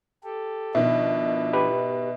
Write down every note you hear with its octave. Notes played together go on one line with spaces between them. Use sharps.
G4 A4
B2 D#3 F3 D4 E4 E5
G4 B4